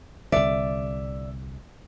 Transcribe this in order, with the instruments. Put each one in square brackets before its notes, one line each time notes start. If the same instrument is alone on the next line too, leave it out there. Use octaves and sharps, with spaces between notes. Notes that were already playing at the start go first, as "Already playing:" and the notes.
[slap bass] C2 D3 [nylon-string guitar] D5 [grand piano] E5